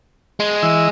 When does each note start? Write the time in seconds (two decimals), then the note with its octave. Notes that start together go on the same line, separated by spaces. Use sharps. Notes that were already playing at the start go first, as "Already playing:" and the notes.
0.40 G#3
0.63 E3 E6